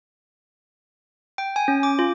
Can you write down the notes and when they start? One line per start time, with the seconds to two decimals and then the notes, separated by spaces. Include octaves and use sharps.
1.38 G5
1.56 G#5
1.68 C#4
1.83 D6
1.99 F4